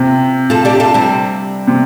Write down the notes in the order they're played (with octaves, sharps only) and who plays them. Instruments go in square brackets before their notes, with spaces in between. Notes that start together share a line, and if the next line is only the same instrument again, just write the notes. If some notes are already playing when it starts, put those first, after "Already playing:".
Already playing: [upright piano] C3 [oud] F4
[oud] F4 A4
D4 G4
F4 A4
G3 C4
[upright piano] C3